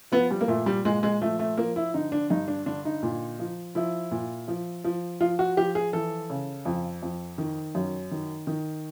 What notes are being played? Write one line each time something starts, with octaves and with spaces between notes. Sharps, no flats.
F3 B3
G3
A#3
A#2 A3
G3
A#2 G#3
G#3
F3 A3
A3
F3 A#3
E4
D3 D#4
D4
G2 D#4
D4
D3 D4
D#4
A#2
F3
F3 E4
A#2
F3
F3
F3 F4
F#4
F3 G4
G#4
E3 A4
C#3
F2
F2
D#3
F#2
D#3
D#3